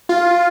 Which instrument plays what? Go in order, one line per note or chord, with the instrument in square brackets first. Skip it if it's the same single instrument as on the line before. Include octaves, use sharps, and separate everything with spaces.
[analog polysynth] F4